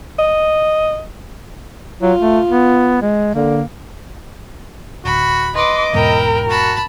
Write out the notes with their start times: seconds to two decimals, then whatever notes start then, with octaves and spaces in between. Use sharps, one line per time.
0.19 D#5
2.02 F#3 F4
2.19 A3
2.48 B3
3.02 G#3
3.35 D3 A#3
5.05 D1 D2 F#4 B5
5.56 B4 D#5 C6 D6
5.93 E2 G#2 B2 E4 A#4 G5
6.49 F#4 A5 B5